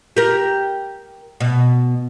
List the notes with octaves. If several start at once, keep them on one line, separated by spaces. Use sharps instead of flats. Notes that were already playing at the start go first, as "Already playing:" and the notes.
G4 A#4
B2